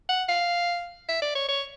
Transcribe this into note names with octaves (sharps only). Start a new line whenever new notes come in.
F#5
F5
E5
D5
C#5
C#5